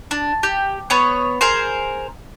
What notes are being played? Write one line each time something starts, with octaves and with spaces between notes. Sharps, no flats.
D4
G4
B3 C#5
G#4 A#4 C5